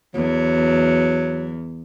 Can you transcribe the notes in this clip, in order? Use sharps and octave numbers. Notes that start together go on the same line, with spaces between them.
E2 F#3